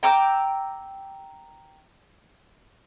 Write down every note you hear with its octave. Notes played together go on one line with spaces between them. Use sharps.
G5 A#5 D6 E6